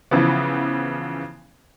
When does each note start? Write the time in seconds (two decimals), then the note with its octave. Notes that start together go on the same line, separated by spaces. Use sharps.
0.11 C#3 E3 F3 B3